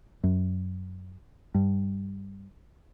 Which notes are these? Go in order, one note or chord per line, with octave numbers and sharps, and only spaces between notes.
F#2
G2